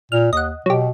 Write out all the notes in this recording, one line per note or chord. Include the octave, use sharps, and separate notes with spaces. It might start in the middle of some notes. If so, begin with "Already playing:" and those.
A#2 F6
D#2 D#5 F#5
B2 F#3 G4